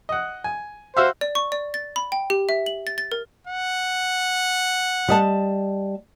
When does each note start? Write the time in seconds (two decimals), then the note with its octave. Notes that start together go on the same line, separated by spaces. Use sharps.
0.09 D#5 F#5
0.44 G#5
0.97 F#4 C5 E5 F5
1.21 D5
1.35 C#6
1.52 D5
1.74 A6
1.96 B5
2.12 G5
2.30 G4
2.49 E5
2.66 F#7
2.87 A6
2.98 A6
3.12 A#4
3.47 F#5
5.09 G3 D#5 A5